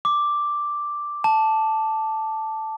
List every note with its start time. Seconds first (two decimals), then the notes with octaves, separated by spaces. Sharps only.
0.05 D6
1.24 A5